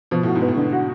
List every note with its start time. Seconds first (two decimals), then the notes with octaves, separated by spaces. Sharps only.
0.11 B2 F3
0.23 A2 F#4
0.35 G#2
0.42 B3
0.48 A2
0.56 D3
0.72 F#4